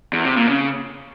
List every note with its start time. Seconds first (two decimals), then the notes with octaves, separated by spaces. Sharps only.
0.13 E2
0.25 C3
0.37 A#2
0.49 C#3